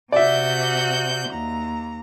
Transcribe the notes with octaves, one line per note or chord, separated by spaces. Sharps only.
C3 F#4 D5 E5 G6
D#2 A#5